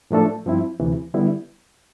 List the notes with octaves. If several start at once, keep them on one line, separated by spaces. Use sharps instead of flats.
A2 F3 A3 D4 A4
G2 F3 C4 E4
D2 C3 E3
D3 G3 B3 E4